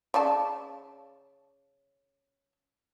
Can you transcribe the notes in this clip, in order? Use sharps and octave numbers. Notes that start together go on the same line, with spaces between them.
C#3 D5 A5